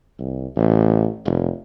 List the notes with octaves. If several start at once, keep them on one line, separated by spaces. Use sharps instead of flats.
C2
A1
F1